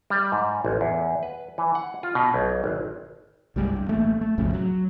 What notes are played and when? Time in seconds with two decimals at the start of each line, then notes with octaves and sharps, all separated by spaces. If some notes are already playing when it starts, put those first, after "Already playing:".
0.10 G3
0.32 G#2
0.65 A1
0.81 E2
1.23 B4
1.58 E3
1.75 F#5
2.03 F4
2.15 B2
2.34 B1
2.64 G#1
3.56 C2 G2 G3 G#3
3.76 G2
3.88 A1 A3 A#3
4.21 A3
4.38 B1 F2 A2 C#3
4.54 F#3